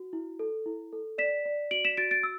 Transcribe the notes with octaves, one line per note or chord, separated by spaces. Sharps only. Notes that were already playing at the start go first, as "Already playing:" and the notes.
Already playing: F#4
E4
A4
E4
A4
D5 B6 E7
D5
F#4 D7 F#7
B6 E7
F#4 A6 D7
A6 D7
E6